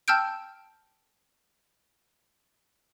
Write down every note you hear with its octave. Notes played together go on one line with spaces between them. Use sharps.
G5 A5 E6 F6 G6 D7